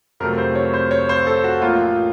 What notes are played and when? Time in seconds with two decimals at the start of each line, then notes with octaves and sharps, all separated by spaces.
0.20 F2 C3 F#3 A3 A#4
0.38 C5
0.55 C#5
0.74 C5
0.91 C#5
1.09 C5
1.27 A4
1.44 F#4
1.62 A1 A2 F3 A#3 F4